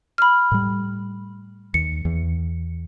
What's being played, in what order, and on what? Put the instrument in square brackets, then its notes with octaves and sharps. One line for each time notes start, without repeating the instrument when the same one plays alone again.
[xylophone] B5 F6
[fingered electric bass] A2 G3
[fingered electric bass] D#2 [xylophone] C#7
[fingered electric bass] E2